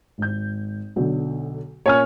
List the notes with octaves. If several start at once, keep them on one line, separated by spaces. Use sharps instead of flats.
G#1 G6
B1 D3 F#3
A#2 A#3 C#4 C#5 G#5 F6